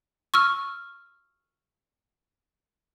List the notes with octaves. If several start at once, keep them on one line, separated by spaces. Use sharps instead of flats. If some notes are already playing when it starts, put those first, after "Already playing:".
C#6 E6 F6